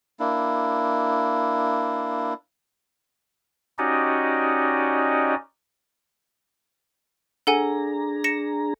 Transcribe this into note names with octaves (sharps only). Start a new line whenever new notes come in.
A#3 D4 E4
C#4 D#4 F#4 G4 D5 D#5
D4 G#4 A4 F#5 G#5 A#5
A#6 C#7 E7